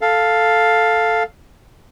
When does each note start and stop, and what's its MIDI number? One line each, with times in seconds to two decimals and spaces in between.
0.01 1.23 69
0.01 1.23 77